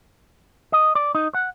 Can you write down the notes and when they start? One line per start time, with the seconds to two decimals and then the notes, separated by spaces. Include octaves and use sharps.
0.72 D#5
0.95 D5
1.15 D#4
1.34 F#5